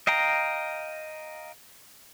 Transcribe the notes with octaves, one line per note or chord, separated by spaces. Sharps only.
D#5 F5 G5 A#5